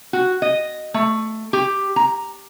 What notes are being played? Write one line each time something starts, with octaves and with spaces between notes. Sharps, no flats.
F#4
D#5
A3
G4
A#5